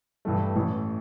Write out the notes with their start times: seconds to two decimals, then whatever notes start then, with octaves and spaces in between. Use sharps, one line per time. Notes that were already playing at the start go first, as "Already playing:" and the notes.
0.25 G2 E3 A3
0.55 A1 A2 E3 A3